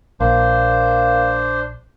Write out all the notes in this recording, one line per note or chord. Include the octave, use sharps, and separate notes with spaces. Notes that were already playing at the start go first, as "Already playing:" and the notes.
A#1 A#3 D4 C5